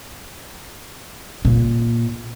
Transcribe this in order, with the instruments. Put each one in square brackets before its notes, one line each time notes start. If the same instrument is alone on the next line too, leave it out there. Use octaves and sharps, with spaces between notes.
[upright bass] A#2